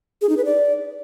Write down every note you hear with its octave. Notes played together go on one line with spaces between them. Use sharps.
G#4
D#4
B4
D5